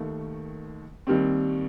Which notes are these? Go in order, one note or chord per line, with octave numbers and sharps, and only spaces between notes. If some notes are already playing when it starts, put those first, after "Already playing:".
Already playing: D#2 D#3 A3
D#2 D#3 G3 C4